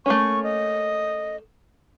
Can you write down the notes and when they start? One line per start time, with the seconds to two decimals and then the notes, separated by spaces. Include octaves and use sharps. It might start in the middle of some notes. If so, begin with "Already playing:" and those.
0.06 A3 A#3 C#4 C#6
0.44 D#5